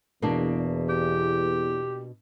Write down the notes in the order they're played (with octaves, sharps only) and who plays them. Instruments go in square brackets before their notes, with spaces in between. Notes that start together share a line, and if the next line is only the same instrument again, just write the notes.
[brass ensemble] E2 [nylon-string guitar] B2 A#3 D4
[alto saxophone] G4